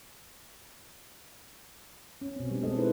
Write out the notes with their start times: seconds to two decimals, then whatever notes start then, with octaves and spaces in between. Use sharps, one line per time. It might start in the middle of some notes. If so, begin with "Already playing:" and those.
2.21 C#4
2.36 B2 C4
2.51 G3 D4
2.63 G#3 C4 D4 A4 D#5
2.75 D#4 E4 G#4 B4 C5